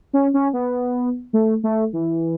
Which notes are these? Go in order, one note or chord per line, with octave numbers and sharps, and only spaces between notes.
C#4
C#4
B3
A3
A3
E3